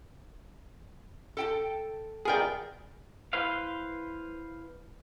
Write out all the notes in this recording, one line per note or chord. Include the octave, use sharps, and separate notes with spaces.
A4 G5 A5
B3 G#4 A#4 D5 G5
E4 B4 C5 F5